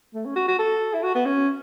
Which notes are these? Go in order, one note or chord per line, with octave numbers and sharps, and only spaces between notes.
A3
C#4
F#4
F#4
A4
E4
F#4
B3
C#4